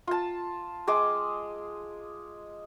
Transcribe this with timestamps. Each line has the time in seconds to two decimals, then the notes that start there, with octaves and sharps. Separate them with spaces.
0.07 F4 A5
0.87 G#3 G#4 D6